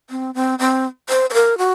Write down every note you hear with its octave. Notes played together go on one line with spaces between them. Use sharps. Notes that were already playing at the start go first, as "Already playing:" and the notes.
C4
C4
C4
C5
C5
A#4
F#4